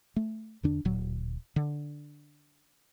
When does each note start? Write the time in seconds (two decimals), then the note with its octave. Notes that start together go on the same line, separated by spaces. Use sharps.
0.16 A3
0.63 E2 D3 D4
0.85 D1 A#2 F#3
1.56 D3